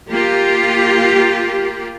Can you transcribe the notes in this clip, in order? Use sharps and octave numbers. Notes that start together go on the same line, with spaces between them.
A#3 F4 G4